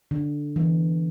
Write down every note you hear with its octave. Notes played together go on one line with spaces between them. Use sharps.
D3
E3